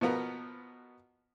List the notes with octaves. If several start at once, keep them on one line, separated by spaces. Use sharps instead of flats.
B2 F3 B3 A#4